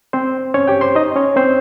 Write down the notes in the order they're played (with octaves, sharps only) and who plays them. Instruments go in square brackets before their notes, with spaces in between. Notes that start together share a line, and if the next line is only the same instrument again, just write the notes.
[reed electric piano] C4 C5
C#4 C#5
G4 G5
C5 C6
D#4 D#5
C#4 C#5
C4 C5